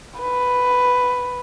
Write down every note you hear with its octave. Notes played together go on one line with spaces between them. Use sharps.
B4